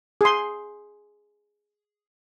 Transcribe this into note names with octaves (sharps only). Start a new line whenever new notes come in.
G#4 C6